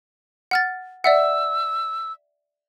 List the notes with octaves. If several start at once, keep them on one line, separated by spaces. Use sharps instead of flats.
F#5 F6 A6
D5 E5 F#5 E6